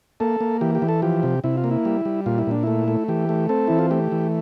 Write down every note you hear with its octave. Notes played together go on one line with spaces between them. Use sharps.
A#3 A4
A#3
E3 G4
G4
E3
A4
F3 G4
C3
C3 E4
F4
A#3
E4
G3
G3
A#2 F4
E4
A#2 D4
A3 E4
A3
E3 G4
A3
C4 A4
E3 E4
F4
A3 G4
E3